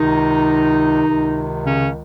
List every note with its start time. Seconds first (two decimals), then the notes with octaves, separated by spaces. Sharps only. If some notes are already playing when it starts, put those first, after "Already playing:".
Already playing: C#2 C3 D#3 D#4
1.07 C#2 C3 D#3
1.63 C#3 C#4